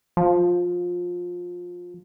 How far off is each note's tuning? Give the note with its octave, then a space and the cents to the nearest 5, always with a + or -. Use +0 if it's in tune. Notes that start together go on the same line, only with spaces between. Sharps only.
F3 +20